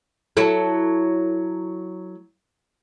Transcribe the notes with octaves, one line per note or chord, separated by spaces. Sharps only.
F#3 E4 A4